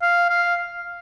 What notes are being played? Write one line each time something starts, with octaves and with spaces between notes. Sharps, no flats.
F5
F5